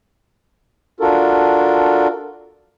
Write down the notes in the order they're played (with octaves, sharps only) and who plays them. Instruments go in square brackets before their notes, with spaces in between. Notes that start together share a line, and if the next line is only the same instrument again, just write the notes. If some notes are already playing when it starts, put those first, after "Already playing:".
[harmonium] D4 F4 F#4 A4 A#4